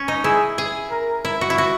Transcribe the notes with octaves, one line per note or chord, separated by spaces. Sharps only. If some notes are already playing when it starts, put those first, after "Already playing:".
Already playing: C#4
D#4
E4 G#4
G#4
A#4
E4
F#4
E4
F#4